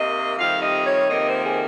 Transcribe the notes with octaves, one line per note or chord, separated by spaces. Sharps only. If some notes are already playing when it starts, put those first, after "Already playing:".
Already playing: C3 D#3 A#3 D#5
F2 C3 D#3 G3 F5
D#5
C#5
F2 C3 D#3 A#3 D#5
C5
G#4